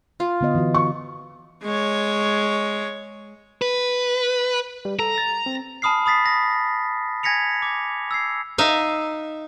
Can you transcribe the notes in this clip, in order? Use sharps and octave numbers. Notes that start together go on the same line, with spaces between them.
F4
D3 B3 D#5
E3 F#4
C#6
G#3 C#5
B4
G3
A4 A#5
A6
C4
G#5 A5 B5 D#6 F6 C7
B5 D#6 A6 B6 C7
A#6
G#5 G#6 A#6 B6 C#7 F7
D6
E6 G#6 C7
D#4 E5 F5